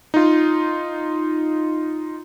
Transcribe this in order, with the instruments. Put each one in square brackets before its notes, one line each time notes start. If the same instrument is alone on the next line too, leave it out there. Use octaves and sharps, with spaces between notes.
[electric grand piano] D#4 F4